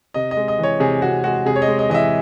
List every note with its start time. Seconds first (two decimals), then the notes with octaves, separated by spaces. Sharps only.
0.14 C3 D#5
0.31 D#5
0.37 G#3
0.48 D#5
0.59 E3 C#5
0.80 C3 G#4
1.02 C3 F#4
1.24 G#3 F#4
1.46 C3 G#4
1.56 C#5
1.62 D#5
1.68 G#3
1.79 D#5
1.90 E3 D#5
1.94 E5